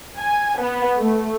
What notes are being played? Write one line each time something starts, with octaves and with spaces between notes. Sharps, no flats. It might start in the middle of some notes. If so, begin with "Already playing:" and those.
G#5
B3
A3